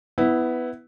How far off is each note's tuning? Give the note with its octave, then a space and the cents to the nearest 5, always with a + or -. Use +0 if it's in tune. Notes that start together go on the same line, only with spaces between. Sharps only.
B3 +10 E4 -10